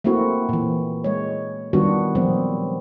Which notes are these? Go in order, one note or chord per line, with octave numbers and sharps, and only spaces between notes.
A3 A#3 C4 E4 F#4
A#2 E3
G#3 C#5
D#3 G3 B3 D4 F4 F#4
A#2 F3 F#3 B3 C4